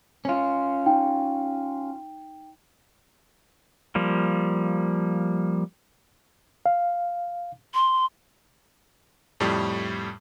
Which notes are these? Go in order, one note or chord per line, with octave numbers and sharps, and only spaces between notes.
C#4 F4
D#4 G5
F3 G3 A#3
F5
C6
F2 A2 G3